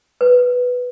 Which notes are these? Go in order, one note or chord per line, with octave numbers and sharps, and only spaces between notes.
B4